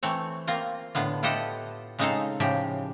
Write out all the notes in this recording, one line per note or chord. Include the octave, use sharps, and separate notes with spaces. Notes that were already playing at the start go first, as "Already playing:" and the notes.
E3 A3 C4 C#5
A#3 C4 F4 A#5
A2 D3 B3 F4
E4 F4 G4 A4 D#5 F#5
C#3 G#3 C4 D#4 A4 F5
A2 C#3 F3 G4